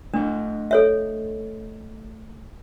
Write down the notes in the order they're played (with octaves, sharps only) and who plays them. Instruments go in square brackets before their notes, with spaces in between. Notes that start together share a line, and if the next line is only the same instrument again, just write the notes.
[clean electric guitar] A3 D#5 F#5 [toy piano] D4
[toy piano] A4 C#5 E5